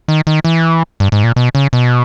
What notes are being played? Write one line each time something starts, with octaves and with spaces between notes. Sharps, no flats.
D#3
D#3
E3
G2
G#2
A#2
B2
C#3
B2